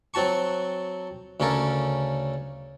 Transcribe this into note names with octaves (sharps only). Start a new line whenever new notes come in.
F#3 C4 F#4 A5 C#6
D2 C#3 C#4 A4 A#4